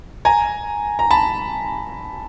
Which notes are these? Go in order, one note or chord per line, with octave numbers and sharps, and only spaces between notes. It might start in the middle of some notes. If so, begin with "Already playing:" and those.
G#5 A#5
A#5
A5 B5